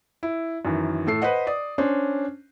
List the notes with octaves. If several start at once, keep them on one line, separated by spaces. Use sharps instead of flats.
E4
F#2 D#3 E3
A2 A4 C7
B4 C5 D#5 F#5
D5 D#6
C#4 D4 C5